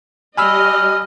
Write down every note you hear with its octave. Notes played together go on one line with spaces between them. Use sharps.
G3 D#5 G#5 B5 E6 F6